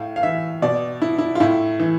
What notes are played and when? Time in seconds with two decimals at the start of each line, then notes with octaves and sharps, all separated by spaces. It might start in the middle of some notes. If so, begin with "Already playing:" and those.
Already playing: A2 F5
0.16 F5
0.23 E3 E5
0.62 B2 D5
1.02 E4
1.18 E4
1.35 F4
1.40 A2 E4
1.80 E3